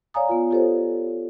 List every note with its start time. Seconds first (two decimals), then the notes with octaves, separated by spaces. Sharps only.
0.14 C#5 D5 F5 G#5 A#5 D#6
0.29 B3 F4
0.51 F4 G4 A4 C5 C#5